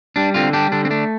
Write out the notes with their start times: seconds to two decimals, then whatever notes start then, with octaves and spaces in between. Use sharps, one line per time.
0.16 G3 D4
0.34 D3 C4 F4
0.53 G3 D4 G4
0.72 D3 D4
0.85 C4
0.90 A3 D4